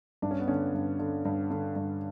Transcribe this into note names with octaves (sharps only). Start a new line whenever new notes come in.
G2 D4
C#4
B3
D3 C#4
G2
D3
G2
D3
G2